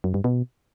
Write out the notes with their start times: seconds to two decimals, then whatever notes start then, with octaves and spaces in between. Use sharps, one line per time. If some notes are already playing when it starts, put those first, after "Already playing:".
0.04 F#2
0.14 G2
0.24 B2